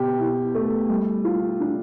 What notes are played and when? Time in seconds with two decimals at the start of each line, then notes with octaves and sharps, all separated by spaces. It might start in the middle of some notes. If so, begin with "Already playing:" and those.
Already playing: B2 G4
0.19 E4
0.55 A3
0.89 G3
1.25 F4
1.60 D4